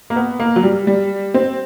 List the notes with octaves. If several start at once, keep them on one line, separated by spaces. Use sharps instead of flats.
A#3
B3
A#3
F#3
G3
G3
C4